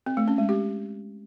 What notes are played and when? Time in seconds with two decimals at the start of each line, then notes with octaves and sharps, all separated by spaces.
0.06 C4
0.17 A3
0.28 C#4
0.38 G#3
0.49 G4